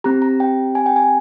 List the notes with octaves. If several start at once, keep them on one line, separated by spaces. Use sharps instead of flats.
C4 G4 A#5
A#5
G5
G#5
G5
G#5